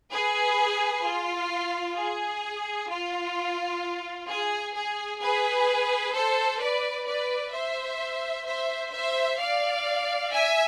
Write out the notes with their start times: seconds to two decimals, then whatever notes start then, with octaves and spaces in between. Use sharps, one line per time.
0.11 G#4 B4
1.04 F4
1.97 G#4
2.90 F4
4.29 G#4
4.75 G#4
5.21 G#4 B4
6.14 A4 C5
6.60 B4 D5
7.07 B4 D5
7.53 C5 E5
8.46 C5 E5
8.92 C5 E5
9.39 D5 F5
10.32 E5 G#5